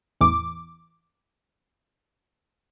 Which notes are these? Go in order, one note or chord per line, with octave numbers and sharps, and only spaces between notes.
A1 E2 E3 D6